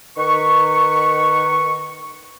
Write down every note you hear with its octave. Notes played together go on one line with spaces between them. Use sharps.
D#3 B4 C#6